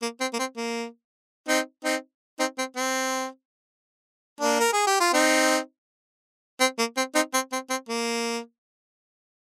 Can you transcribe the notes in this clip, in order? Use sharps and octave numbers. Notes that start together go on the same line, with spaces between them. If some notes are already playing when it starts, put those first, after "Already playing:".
A#3
C4
A#3
C4
A#3
C4 D#4
C4 D#4
C4 D#4
C4
C4
A#3 D4
A#4
G#4
G4
F4
C4 D#4
C4
A#3
C4
C4 D#4
C4
C4
C4
A#3